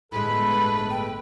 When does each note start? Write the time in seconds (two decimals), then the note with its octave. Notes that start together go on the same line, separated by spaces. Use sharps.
0.12 G1 A2 G#3 A4 B4 B5
0.90 G5